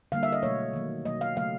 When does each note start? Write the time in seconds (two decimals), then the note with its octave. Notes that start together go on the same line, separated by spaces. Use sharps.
0.12 D3 G3 A#3 F5
0.23 E5
0.33 D#5
0.43 B2 F#3 A3 C#5
0.73 D#3 F#3 A#3
1.05 B2 F#3 A#3 D#5
1.21 F5
1.36 C#3 F#3 A3 F5